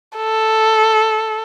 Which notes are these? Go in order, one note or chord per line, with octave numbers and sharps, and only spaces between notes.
A4